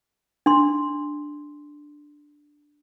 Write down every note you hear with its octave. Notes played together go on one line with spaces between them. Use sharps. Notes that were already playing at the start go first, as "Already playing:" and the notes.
D4 C6